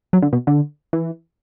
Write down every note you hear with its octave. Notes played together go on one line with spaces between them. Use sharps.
F#3
D3
B2
D3
E3